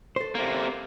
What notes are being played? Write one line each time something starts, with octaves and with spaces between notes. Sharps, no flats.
A4 C5
C3 A#3